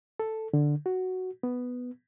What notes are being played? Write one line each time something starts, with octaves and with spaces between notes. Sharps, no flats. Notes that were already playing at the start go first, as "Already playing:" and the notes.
A4
D3
F#4
B3